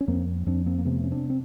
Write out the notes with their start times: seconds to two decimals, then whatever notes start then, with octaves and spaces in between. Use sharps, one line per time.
0.01 C#4
0.08 F2 A#3 C4
0.46 F2 C4 D4
0.66 A#3 C4
0.78 A#3
0.85 C3 A3 B3
1.04 C#4
1.11 C4 D4
1.30 C4